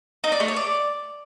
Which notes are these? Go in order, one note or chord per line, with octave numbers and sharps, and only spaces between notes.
D#4
D5
A3
C#5
D5